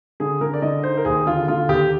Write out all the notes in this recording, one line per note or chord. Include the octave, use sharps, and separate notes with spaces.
D3 G#4
D3 A#4
D5
D3 D#5
D#4 C5
A#4
D#2 G#4
D3 F4
D3 F4
D#2 G4